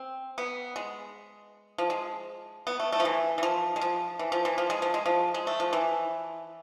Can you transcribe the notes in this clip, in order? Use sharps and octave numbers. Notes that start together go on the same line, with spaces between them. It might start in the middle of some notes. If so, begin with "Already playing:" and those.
Already playing: C4
B3
G#3
F3
G#3
B3
A3
A3
F3
E3
E3
F3
G#3
F3
E3
F3
E3
F3
G#3
F3
G#3
F3
G#3
A3
F3
E3